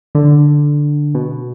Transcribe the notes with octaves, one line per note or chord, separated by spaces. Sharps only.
D3
B2